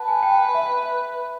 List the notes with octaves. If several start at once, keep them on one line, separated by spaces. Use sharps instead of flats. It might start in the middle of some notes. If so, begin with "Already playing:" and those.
Already playing: B4 F#5 A5
G#5
G5
E5